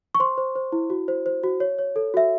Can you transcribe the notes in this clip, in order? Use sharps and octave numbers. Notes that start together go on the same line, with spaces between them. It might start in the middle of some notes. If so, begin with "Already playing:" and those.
C#6
C5 C6
C5
C5
E4
F#4
C5
C5
F#4
C#5
C#5
A4
F#4 E5